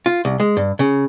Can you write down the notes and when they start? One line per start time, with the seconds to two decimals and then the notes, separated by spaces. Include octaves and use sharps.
0.06 F4
0.25 C2
0.40 G#3
0.57 G2
0.79 C#3